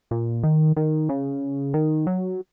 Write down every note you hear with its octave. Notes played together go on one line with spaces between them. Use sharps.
A#2
D#3
D#3
C#3
D#3
F#3